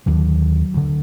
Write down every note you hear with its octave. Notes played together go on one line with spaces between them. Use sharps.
D#2 D3 F#3
D2 D3